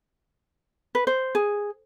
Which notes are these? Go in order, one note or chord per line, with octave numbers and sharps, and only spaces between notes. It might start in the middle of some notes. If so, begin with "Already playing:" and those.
B4
C5
G#4